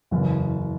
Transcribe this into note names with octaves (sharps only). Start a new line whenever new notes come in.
F#1 E2 C#3